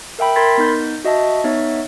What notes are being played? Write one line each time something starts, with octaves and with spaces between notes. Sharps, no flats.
A#4 E5 G5 B5
A#4 B5 C6 G#6 A6 B6
B3 D#4 G6
F#4 D#5 E5 A5
B3 D#4 C#5 E5